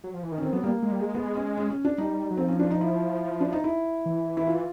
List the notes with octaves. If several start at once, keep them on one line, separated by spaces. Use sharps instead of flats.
F#3
F3
E3
D#3
C#4
D#3 C4
F#3 B3
G3 A#3
G#3
G3
G#3
B3
C#4
C#4
C#4
D4
G3 D#4
F#3
F3 C4
C#4
D4
D#4
E4
D4
D#4
E4
E3
E4
F4